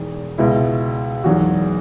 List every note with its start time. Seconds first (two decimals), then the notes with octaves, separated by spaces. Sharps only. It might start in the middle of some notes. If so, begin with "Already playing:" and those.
Already playing: E1 E2 D#3
0.38 C#2 B2 G#3 E4
1.24 E1 E2 D#3 F#3 F#4